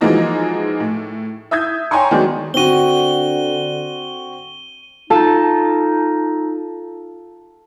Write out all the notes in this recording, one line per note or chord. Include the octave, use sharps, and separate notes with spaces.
E3 F3 G#3 A#3 D#4 F#4
A2
E5 D#6 G6 G#6
C#5 G5 G#5 A#5 C6 C#6
D#3 F#3 G#3 B3 D4 F#4
D3 C4 F#4 D#7 G7
D#4 F4 A4 A5